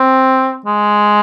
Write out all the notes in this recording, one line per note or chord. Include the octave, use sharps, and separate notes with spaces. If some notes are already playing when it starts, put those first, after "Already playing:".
Already playing: C4
G#3